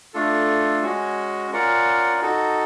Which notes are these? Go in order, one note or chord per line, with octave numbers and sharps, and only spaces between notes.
A3 D4 F4 A4
G#3 C#4 F#4
C#4 F4 A#4 D5 F#5
D#4 F#4 A4